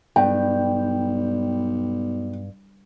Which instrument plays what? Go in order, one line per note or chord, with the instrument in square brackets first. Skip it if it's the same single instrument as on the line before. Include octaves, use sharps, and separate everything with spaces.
[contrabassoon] B1 [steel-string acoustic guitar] G2 [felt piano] G5